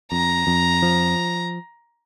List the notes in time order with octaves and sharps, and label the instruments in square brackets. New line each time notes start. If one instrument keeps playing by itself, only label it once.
[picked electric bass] F2 [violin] A#5
[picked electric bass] F2
F3